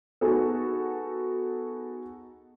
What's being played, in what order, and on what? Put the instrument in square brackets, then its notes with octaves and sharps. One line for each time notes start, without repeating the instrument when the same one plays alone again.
[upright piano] B3 D#4 F#4 G#4 A4